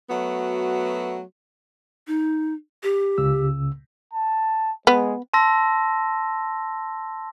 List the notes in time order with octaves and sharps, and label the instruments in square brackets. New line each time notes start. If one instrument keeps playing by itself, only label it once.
[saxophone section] F#3 A3 B3 F#4
[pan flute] D#4
G4
[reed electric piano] C#2 C#3 E6
[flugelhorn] A5
[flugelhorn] G#3 [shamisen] B3
[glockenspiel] A5 C6 E6 A#6